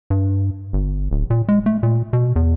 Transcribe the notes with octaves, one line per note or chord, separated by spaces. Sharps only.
G2
G1
D1
A#2
G#3
A3
A#2
B2
E2